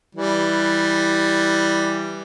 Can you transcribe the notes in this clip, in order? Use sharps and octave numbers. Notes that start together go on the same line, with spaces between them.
E3 G3